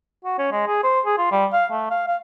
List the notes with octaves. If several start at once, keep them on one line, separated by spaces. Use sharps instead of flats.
F#4
C#4
G#3
G#4
C5
G#4
F4
G3
F5
A3
F5
F5